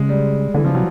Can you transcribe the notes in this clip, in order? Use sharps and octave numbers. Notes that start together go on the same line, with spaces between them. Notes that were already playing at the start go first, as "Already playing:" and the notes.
Already playing: C#3 G#3
G3
D3 E3
C#3 F3
C3 F#3